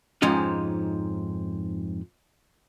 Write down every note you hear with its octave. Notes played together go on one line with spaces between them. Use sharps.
F2 G#2 F3 C#4 D#4